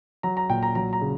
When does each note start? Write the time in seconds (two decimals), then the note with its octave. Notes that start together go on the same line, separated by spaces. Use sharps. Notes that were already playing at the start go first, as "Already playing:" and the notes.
0.23 F#3 A#5
0.37 A#5
0.50 A#2 G5
0.63 A#5
0.75 F#3 A#5
0.93 A#5
1.01 C#3